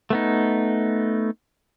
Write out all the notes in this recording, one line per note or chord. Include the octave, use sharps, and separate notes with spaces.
A3 B3 D#4